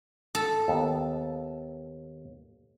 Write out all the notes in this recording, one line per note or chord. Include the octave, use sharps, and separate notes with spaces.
A4
D#2 B3